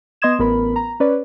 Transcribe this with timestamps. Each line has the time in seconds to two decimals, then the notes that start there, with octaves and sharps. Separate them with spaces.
0.22 B3 D#5 C6 D#6 G#6 E7
0.39 A1 B3 A#4 B5
0.76 A#5
1.00 C#4 B4 D5